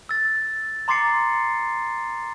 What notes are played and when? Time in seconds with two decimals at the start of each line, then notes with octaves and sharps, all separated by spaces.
0.09 E6 A6
0.88 A#5 C6 D6 A6 C7 C#7